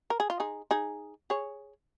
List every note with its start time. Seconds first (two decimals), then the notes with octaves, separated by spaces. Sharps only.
0.10 A#4
0.20 G#4
0.30 F4
0.40 D#4 G#4
0.71 D#4 G#4
1.30 G#4 C#5